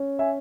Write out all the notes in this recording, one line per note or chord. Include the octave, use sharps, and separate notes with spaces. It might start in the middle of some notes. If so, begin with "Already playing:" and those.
Already playing: C#4
E5 G#5